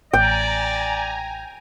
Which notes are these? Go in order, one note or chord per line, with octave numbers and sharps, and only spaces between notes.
A1 D5 G5 G#5 A#5